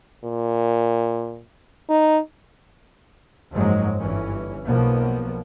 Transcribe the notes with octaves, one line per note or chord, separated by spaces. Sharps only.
A#2
D#4
F#1 G#2 F3 F#3 G#3
G1 E3 C#4
B1 B2 F3 A#3 B3